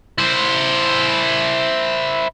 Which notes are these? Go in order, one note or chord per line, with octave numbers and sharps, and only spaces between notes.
E4 C5